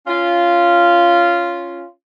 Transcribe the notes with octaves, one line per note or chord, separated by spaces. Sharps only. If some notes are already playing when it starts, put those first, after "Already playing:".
C#4 F4